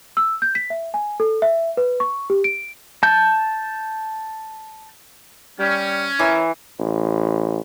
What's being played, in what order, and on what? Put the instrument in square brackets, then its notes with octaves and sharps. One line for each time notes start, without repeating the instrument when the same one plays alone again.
[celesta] E6
G6
B6
E5
G#5
A4
E5
B4
C#6
G4
D7
[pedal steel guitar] A5 G6
[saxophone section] G3 [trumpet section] C#4
[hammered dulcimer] E3 [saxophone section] E4 A#4 C#5
[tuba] A1